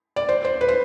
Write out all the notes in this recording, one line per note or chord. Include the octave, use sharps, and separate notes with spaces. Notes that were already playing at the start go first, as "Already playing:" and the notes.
D5
C5
C5
B4
C5